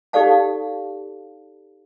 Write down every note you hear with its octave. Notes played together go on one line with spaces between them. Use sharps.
D#4 G4 A4 D5 F5 A5